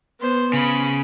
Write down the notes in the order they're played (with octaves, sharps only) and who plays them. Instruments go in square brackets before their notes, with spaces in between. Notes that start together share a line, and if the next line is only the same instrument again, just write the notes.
[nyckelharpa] B3 C5
[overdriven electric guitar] C#3 [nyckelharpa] B5